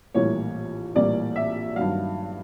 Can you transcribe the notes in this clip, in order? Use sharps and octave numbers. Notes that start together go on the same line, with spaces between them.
A#1 A2 E3 G3 A#3 C#5
A#1 A2 E3 G3 A#3 D5
E5
G2 D#3 F#3 F5